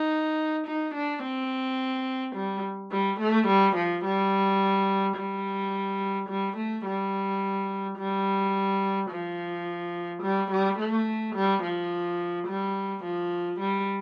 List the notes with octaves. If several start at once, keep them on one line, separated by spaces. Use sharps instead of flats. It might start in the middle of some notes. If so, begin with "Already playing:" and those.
Already playing: D#4
D#4
D4
C4
G3
G3
A3
G3
F3
G3
G3
G3
A3
G3
G3
F3
G3
G3
A3
G3
F3
G3
F3
G3